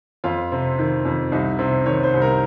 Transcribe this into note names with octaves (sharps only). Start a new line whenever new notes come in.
F2 F4
C3
D#3
F2
C2 D#4
C3
D#3 C#5
C5
C2
A#4